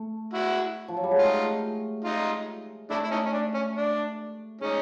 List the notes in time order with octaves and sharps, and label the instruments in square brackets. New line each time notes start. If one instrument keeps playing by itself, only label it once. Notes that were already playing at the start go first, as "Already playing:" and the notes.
Already playing: [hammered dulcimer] A3
[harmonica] E4 F#4
[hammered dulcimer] F3
F#3
G3
G#3
[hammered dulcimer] A3 [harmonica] D#4 F4
[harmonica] D#4 F4
[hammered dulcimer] A3 [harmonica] D4 E4
[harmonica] E4
C#4 D#4
C#4
D4
C#4
D4
[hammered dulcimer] G#3 [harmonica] C#4 D#4